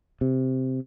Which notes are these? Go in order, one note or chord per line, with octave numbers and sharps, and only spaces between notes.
C3